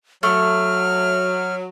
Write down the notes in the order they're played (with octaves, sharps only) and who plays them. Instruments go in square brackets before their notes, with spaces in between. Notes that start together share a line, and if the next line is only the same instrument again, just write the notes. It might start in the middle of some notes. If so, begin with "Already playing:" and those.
[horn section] F#3 [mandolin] A3 [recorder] F6